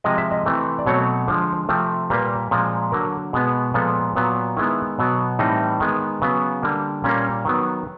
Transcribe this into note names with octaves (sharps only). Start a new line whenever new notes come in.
C3 F3 G#3 D#5
E5
D#5
C3 E3 A3 C4
D5
B2 F#3 A3 C4 C#5
D3 F3 G#3 C5
C3 F3 A3 C4
A#2 G3 A#3 B4
A#2 F3 G#3 C4
D3 F#3 A#3 A#4
B2 G#3 B3
A#2 F3 G#3 B3 A4
A#2 F#3 B3
D#3 G#3 B3 E4
B2 F#3 B3
A2 E3 G3 C4 D#4
D#3 G#3 B3
C#3 F#3 B3
D3 G3 A#3
A#2 G3 A#3 C#4
D#3 F#3 B3